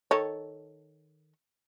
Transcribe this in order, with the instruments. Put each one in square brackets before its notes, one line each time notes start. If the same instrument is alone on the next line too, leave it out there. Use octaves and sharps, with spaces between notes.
[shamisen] D#3 A4 C#5